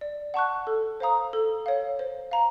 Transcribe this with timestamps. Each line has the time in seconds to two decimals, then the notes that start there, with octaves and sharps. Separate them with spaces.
0.01 D5
0.34 F#5 A5 C#6 F#6
0.67 A4
1.00 C5 F5 A#5 D#6
1.33 A4
1.66 C#5 F5
1.99 C5
2.31 F5 A#5